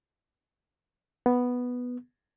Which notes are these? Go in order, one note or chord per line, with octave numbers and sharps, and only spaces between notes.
B3